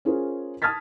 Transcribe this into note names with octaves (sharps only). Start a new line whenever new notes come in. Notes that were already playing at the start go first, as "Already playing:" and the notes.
C#4 F4 G#4 A#4 C5
A5 D#6 F6 G#6 A6 B6